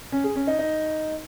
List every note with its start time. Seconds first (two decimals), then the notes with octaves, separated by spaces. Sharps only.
0.12 C#4
0.24 G#4
0.36 C#4
0.47 D#4
0.59 D#4